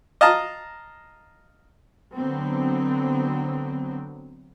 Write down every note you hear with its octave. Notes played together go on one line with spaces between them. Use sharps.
D#5 F5 A5 A#5
D3 F#3 B3 C4